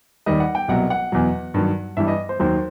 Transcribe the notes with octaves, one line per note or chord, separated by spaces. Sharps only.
D#2 D#3 G3 D#5
F#5
G5
C2 B2 F#3 F#5
F#5
E2 B2 F#3
G2 D#3 F#3
G2 E3 G3 E5
D#5
C5
D#2 D#3 F#3 C5